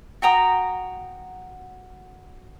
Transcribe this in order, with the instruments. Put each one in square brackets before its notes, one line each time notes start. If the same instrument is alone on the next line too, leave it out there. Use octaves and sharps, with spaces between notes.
[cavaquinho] F#4 G5 A#5 D#6